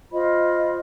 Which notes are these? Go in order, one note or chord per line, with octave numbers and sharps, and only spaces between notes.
F4 C5 D#5 B5